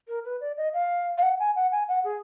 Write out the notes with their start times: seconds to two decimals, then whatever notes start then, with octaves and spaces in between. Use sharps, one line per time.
0.08 A#4
0.25 B4
0.41 D5
0.57 D#5
0.74 F5
1.18 F5
1.23 F#5
1.40 G#5
1.56 F#5
1.72 G#5
1.88 F#5
2.04 G#4